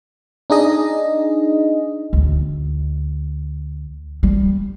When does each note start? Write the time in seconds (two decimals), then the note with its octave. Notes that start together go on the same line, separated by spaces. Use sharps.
0.50 D4 D#4 G#4 D#5
2.13 D2
4.23 G3